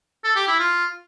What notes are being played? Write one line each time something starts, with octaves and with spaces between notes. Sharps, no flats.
A4
G4
E4
F4